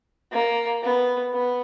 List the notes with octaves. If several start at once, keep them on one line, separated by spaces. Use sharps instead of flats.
A#3
B3
B3